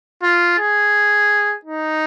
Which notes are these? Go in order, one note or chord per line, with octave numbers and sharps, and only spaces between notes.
F4
G#4
D#4